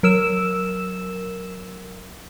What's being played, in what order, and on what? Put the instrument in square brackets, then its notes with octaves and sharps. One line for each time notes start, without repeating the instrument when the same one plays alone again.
[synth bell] F#3 A#4 E6 E7